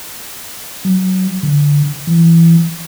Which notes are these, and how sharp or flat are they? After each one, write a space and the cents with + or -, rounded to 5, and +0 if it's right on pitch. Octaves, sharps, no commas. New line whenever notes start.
F#3 +15
D3 -10
E3 +15